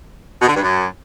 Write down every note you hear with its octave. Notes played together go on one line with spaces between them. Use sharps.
B2
D3
G2
F#2